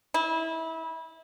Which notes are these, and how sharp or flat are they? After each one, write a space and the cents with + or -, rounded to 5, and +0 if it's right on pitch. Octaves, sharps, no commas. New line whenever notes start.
E4 -25